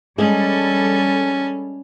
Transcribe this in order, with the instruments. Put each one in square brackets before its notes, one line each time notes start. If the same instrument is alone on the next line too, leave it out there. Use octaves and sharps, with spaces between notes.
[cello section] G3 A4 [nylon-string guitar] G#3 G#4 [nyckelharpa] C#4